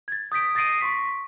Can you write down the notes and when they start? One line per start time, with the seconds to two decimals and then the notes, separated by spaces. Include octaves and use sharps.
0.08 G#6 A6
0.32 D#6 G6 B6 D7
0.55 D#6 A6 A#6 C7 D7 D#7
0.81 C6 C#6 B6